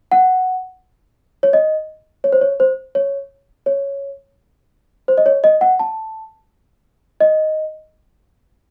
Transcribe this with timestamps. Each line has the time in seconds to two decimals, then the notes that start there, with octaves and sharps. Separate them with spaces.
0.12 F#5
1.43 C#5
1.53 D#5
2.24 C#5
2.33 C5
2.41 C#5
2.60 C5
2.95 C#5
3.66 C#5
5.08 C5
5.18 D#5
5.26 C#5
5.44 D#5
5.61 F#5
5.79 A5
7.21 D#5